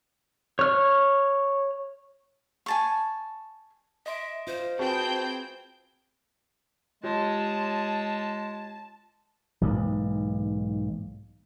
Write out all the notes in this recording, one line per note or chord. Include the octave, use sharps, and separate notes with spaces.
C#5 F6
G#5 A5 C#6
D#5 E5 C6 D7
F4 C5
C4 F#4 G#4 B4 G5 A5 G6
G#3 F4 G4 C#5 A5
B1 G#2 E3 A#3